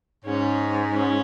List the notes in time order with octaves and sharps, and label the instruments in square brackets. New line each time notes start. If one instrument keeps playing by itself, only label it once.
[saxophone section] G#2 [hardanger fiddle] C#4
[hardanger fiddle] C#4